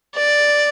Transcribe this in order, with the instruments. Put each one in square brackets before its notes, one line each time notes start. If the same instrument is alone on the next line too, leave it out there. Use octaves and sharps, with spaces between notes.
[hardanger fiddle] D5